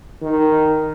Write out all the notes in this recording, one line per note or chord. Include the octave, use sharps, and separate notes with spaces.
D#3